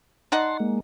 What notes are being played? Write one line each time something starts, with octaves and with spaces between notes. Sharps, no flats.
D#4 D5 F#5 A5 C6
G#3 A#3